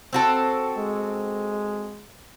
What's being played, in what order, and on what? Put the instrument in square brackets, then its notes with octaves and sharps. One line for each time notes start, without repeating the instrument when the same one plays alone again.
[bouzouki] C4 F#4 A4
[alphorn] G#3